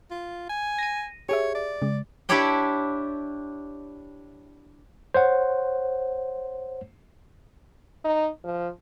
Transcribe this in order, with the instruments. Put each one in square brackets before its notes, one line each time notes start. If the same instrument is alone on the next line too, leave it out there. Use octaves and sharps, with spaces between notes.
[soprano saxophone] F4
G#5
[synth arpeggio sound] A#6 D#7
[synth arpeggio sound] G4 G#4 E5 [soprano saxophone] C#5
[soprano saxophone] D5
[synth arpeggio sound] C#3 G#3
[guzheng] D4 E4 G4 C#5 D5 G5
[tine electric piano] C5 C#5 F#5
[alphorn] D#4
F3